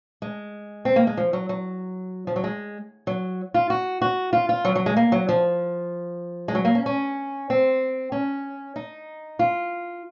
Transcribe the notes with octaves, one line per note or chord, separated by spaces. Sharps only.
G#3
C4
A#3
G#3
F3
F#3
F#3
F3
F#3
G#3
F#3
F4
F#4
F#4
F4
F4
F#3
F#3
G#3
A#3
F#3
F3
G#3
F#3
A#3
C#4
C#4
C4
C#4
D#4
F4